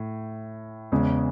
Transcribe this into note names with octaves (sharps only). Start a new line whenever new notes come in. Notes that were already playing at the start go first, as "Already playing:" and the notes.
Already playing: A2
E2 C#3 G#3